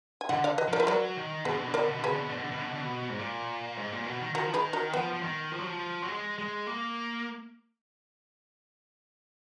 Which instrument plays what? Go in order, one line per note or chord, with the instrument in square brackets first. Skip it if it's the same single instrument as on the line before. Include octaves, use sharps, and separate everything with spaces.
[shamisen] G#5
[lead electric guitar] D3 [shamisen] D#5 F#5
[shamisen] D5 F5
B4 D#5
[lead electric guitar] F3 [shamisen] A#4 D5
[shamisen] B4
[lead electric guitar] F#3 [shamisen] A#4 D5
[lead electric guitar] D#3
[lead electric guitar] B2 [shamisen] G#4 B4
[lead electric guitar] D3
B2
D3
[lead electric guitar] B2 [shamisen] A#4 D5
[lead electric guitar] D3
B2
D3
[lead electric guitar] B2 [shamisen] G#4 B4
[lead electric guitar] D3
B2
D3
B2
D3
B2
D3
B2
D3
B2
G#2
A#2
G#2
A#2
B2
D#3
[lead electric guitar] D#3 [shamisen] F#4 A#4
[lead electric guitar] F3
[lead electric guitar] D#3 [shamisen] G#4 B4
[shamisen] F#4 A#4
[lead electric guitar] F3 [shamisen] B3
[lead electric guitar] F3
D#3
F3
F#3
F3
F#3
G#3
G#3
A#3